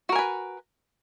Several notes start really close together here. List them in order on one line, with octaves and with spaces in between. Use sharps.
F#4 A#4 G#5 B4